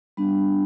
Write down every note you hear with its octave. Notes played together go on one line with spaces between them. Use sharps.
G3 B3 D4 B5